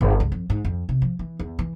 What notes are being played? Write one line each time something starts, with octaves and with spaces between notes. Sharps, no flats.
G1
C#2
F2
G#2
F2
C3
F3
E3
E2
E3